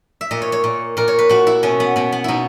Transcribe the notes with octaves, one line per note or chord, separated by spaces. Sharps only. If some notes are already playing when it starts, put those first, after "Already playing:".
E5
A#2 D#5
C#5
C#5
A#2
A#2 A#4
C#5
B4
A#2 F#4
E4
B2 C#4
B3
B2 B3
B3
B2 D#4 E4